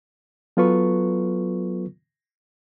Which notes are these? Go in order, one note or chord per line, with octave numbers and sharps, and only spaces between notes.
F#3 B3 F4 A4 B4 C#6